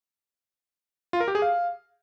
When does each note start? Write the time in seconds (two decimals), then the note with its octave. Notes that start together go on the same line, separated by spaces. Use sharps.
1.13 F4
1.20 A#4
1.28 G4
1.35 G#4
1.42 F5